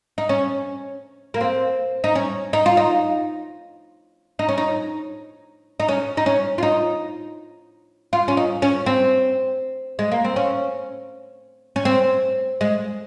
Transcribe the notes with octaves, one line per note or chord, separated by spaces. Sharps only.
D#4
C#4
A#3
C4
D#4
C#4
D#4
F4
D#4
D#4
C#4
D#4
D#4
C#4
D#4
C#4
F4
D#4
F4
C#4
D#4
C#4
C4
G#3
A#3
C4
C#4
C#4
C4
G#3